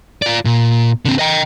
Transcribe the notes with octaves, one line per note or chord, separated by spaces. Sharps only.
F4 D5
A#2
D3 C4
D#5 G5